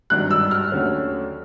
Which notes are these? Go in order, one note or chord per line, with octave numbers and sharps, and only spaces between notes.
G#1 G2 D#3 F#3 F#6
E6
F6
D#2 D3 F#3 A3 C#4